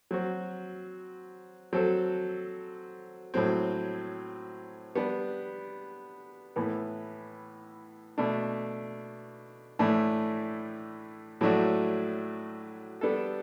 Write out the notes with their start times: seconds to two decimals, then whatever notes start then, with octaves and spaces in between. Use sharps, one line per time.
0.11 F#3 C4 F#4
1.73 F#3 C4 F#4 A4
3.34 A2 F#3 C4
4.95 G3 B3 D4
6.56 A2 E3 B3
8.18 B2 A3 D4
9.79 A2 E3 A3 D4
11.41 A2 F#3 A3 D4 F#4
13.01 G3 B3 D4 A4